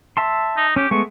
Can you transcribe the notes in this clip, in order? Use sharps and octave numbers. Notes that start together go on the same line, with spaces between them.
E5 A5 C6
D#4
C#4 G4
G#3 A3 B3 C#6